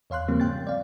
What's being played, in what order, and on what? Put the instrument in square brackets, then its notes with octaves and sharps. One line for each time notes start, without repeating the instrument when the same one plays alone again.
[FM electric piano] E2 C#5 F5 C6 F#6
C#3 F3 G3 A#3 C4
G#2 G5 A6
D5 F5